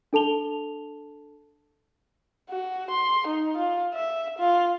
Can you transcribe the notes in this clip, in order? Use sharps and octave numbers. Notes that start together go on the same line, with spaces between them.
D4 A4 A5 F7 G7
F#4
C6
D#4
F4
E5
F4